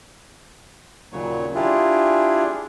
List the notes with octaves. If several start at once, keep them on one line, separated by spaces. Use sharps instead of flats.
D#2 A#2 C#3 F#3 C#5
D4 E4 F4 G4 G#4